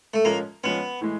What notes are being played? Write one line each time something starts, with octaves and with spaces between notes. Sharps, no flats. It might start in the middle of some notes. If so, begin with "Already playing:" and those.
A3
F3 G#3 A#3 C#4
F3 G#3 B3 C#4
A2 E3 G#3